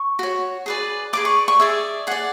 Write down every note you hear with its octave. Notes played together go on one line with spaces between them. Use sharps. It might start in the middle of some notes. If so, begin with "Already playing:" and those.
Already playing: C#6
F#4 C#5
G#4 B4 D5
G#4 B4 D5 D6
C#6
C#6
G#4 D5 E5
G#4 D5 F#5